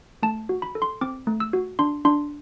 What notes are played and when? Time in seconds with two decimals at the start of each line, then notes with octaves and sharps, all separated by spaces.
0.23 A3 A5
0.49 F#4
0.62 B5
0.75 A4
0.82 C6
1.01 C4 D6
1.27 A3
1.40 E6
1.53 F#4
1.79 D4 C6
2.05 D4 C6